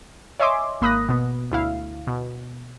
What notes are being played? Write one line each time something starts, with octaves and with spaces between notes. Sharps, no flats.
C#5 D#5 E5 G#5 C6 D6
G#1 A#3 B5 D#6 F#6 A#6
B2 B3
D2 E4 F5
B2